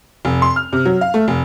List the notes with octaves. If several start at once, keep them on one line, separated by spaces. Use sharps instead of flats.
F1
C6
F6
C3
F#3
F5
A3
F1